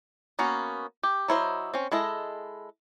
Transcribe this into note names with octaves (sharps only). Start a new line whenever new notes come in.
A#3 B3 C#4 F#4
G4
F#3 E4 C5 D#5
C4 C#4
G#3 E4 A4 D#5